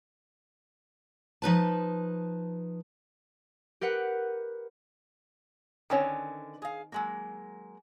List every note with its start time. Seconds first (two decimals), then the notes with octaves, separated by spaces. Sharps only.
1.42 F3 D#4 B4 A5
3.81 G4 A#4 B4 F#5
5.90 D3 D#3 C4 C#4 B4 C#5
6.62 G#4 F5
6.92 F#3 G#3 A#3